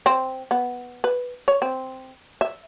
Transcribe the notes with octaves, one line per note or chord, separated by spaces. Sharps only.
C4
B3
B4
C#5
C4
E5